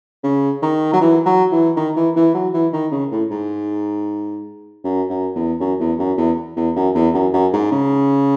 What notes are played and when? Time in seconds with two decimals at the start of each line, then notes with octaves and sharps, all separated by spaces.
0.23 C#3
0.62 D#3
0.93 F#3
1.01 E3
1.25 F#3
1.52 E3
1.77 D#3
1.96 E3
2.16 E3
2.34 F#3
2.54 E3
2.73 D#3
2.91 C#3
3.11 A2
3.31 G#2
4.84 F#2
5.10 F#2
5.35 E2
5.60 F#2
5.80 E2
5.99 F#2
6.17 E2
6.57 E2
6.76 F#2
6.94 E2
7.14 F#2
7.33 F#2
7.53 G#2
7.71 C#3